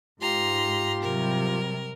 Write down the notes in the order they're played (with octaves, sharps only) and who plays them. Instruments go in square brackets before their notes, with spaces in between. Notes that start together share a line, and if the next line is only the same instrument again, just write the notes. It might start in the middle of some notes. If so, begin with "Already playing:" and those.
[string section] G#2 [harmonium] F4 G4 [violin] A#5 C6
[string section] C3 F#3 G3 [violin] A#4